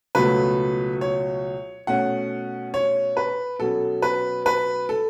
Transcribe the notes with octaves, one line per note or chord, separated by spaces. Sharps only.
C#2 B2 F#3 A3 B4
C#5
B2 A3 C#4 F#5
C#5
B4
B2 F#3 C#4 A4
B4
B4
A4